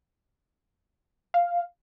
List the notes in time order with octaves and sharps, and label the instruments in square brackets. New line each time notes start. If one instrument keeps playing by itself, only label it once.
[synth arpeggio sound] F5